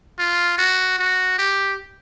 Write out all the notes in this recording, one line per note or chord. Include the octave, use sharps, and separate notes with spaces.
F4
F#4
F#4
G4